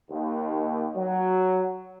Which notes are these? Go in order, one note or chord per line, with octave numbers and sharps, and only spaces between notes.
D#2
F#3